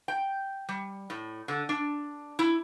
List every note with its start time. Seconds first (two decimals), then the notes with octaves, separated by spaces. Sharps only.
0.08 G5
0.69 G3
1.10 A2
1.48 D3
1.69 D4
2.39 E4